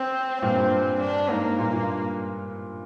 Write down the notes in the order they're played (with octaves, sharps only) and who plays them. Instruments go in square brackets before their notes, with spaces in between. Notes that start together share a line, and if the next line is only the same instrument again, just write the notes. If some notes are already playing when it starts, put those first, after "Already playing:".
Already playing: [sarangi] C4
[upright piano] G2 A#2 [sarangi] C4
[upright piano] G2
[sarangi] D4
[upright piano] G#2 [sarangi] A#3
[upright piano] G2 A#2
G2 A#2